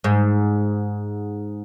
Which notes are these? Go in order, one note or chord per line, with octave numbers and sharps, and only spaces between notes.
G#2